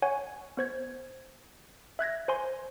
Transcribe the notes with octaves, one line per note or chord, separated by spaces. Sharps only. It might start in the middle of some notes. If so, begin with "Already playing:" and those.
C#5 F#5 G#5
B3 C5 G#6
E5 F#6 G#6 A#6
C5 G#5 C6